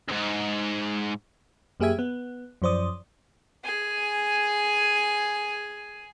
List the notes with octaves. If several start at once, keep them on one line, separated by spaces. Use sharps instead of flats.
D2 G#2
F#2 A#3 G4 G#4 E5 G#6
B3
F#2 F3 C5 D5 D#6
G#4 G#5